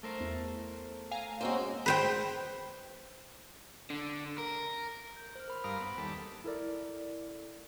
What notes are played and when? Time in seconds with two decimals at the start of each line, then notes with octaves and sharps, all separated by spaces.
0.03 A3 A#4 C5
0.20 E2
1.11 F5 G#5 A#5
1.41 C#3 G#3 A#3 C4 F#4 C5
1.86 B4 C5 G5
3.90 D3
4.38 A#4
5.17 G6
5.35 C5 F6
5.48 A#4 B5 C6
5.64 G2 A#4 F5 B5 D#6 D7
5.81 B3
5.98 D#2 G3 A4 B6
6.44 E4 A4 A#4 D5